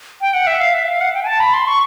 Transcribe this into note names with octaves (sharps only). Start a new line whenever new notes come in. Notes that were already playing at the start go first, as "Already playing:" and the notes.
G5
F#5
E5
F5
E5
F5
F#5
G5
G#5
A5
B5
C6
C#6